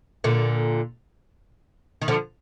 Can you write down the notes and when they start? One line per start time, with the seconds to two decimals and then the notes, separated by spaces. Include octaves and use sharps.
0.24 A#2 D3
2.02 D#3
2.08 D3 F3